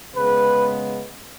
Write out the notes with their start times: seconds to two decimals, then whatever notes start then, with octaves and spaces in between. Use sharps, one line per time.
0.15 C#3 G#3 B3 B4